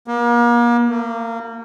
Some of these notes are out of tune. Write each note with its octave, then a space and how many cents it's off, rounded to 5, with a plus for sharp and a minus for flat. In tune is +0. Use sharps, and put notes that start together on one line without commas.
A#3 +35
A#3 -30